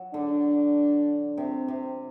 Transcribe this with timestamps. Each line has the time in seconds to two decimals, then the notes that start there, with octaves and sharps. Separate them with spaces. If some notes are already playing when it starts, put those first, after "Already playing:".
Already playing: F#3
0.14 D3 D4
1.37 C3
1.68 C3